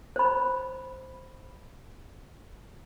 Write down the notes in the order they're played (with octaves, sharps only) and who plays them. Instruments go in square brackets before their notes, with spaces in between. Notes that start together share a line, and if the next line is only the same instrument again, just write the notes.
[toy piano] C5 B5